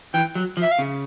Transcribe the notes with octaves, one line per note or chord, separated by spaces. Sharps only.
E3 G5
F#3
F3
E5
F5
C#3